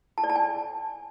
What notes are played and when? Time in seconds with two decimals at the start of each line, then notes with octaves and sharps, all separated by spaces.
0.18 A5
0.24 D5
0.30 A5
0.36 G#5